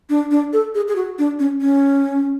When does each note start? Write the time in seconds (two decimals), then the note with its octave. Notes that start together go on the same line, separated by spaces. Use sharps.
0.10 D4
0.31 D4
0.53 A4
0.75 G#4
0.88 G#4
0.96 F#4
1.19 D4
1.40 C#4
1.61 C#4